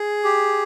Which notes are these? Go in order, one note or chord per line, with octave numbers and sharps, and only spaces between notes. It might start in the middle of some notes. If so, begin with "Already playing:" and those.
Already playing: G#4
G4